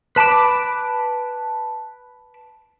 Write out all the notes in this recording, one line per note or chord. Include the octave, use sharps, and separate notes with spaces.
B4 A5 B5 D6